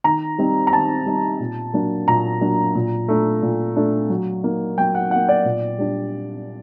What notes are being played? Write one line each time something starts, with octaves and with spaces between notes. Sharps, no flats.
D#3 A#5
G3 C4 D#4
A#5
D#3 A5
G3 C4 D#4
A#2
F#3 A#3 D4
A#2 A#5
F#3 A#3 D4
A#2
A3 D4
A#2
A3 D4
F#3
A#3 D#4
F#3 G5
F#5
A#3 D#4 F#5
D5
A#2
G3 D4